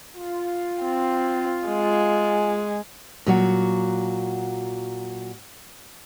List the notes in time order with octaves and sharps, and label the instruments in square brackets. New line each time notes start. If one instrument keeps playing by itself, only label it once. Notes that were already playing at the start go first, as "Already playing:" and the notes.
[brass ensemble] F4
[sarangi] C4
G#3
[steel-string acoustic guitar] A#2 F#3 F#4